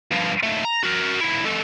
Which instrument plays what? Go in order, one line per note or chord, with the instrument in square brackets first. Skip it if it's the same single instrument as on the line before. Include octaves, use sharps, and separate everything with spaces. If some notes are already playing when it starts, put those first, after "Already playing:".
[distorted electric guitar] G2 F3
D#2 A3
A#5
F#4 A#4
D#2 E4
G#3 A4